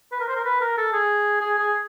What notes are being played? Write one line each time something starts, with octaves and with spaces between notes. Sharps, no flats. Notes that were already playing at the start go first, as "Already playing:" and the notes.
B4
A#4
C5
A#4
B4
A#4
A4
G#4
G#4
G#4